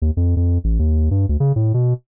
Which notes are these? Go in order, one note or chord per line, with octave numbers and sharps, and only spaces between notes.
D#2
F2
F2
A1
D#2
G2
D2
C#3
A2
B2